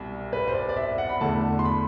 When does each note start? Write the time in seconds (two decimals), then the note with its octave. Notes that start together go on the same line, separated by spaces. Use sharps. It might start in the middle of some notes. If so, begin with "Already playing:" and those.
Already playing: C2 B2 G3
0.33 B4
0.48 C5
0.54 D5
0.69 D5
0.77 E5
0.98 F#5
1.09 B5
1.20 E2 D3 A3 A5
1.59 C6
1.65 B5